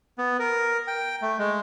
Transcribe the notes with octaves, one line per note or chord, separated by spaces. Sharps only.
B3
A#4
G5
A3
G#3